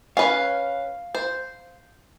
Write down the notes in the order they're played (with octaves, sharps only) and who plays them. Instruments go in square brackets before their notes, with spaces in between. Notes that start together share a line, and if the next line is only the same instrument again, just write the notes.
[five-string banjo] C#4 B4 [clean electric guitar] F5
[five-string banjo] C5